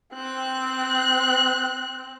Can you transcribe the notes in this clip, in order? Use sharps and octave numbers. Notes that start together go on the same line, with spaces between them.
C4 F#6